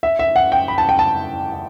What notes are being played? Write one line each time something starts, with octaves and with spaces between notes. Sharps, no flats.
E5
E5
F#5
G5
B5
A5
G5
A5